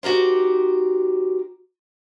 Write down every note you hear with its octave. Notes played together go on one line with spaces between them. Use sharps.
D#4 F#4 G4 A#4 C5